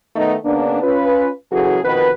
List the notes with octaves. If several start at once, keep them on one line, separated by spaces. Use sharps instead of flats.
D#3 A3 B3 D#4
C#3 A#3 B3 D4
C#4 F4 B4
C#3 E3 F#3 F#4 G#4 A4
F2 B2 D#3 B3 B4